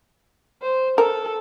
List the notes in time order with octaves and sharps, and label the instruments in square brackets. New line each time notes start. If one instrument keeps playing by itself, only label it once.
[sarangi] C5
[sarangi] A4 [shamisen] A#4